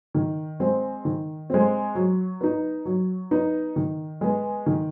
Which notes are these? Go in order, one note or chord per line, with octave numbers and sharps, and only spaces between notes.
D#3
G#3 C4
D#3
G#3 C4
F#3
B3 D#4
F#3
B3 D#4
D#3
G#3 B3
D#3